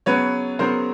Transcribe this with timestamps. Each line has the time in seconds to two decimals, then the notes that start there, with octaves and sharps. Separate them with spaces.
0.06 C#3 F#3 B3 B4 C#5
0.59 C#3 F#3 B3 A#4 C5